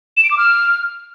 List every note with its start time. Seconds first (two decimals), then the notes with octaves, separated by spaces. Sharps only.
0.17 E7
0.24 D7
0.31 D6
0.38 F6